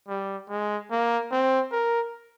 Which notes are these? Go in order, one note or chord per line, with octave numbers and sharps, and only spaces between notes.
G3
G#3
A#3
C4
A#4